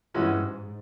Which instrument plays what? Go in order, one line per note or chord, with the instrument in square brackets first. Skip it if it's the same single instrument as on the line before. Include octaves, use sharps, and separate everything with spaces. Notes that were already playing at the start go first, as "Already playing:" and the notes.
[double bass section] G2 [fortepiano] E3 G#3 C#4 F#4
[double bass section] G#2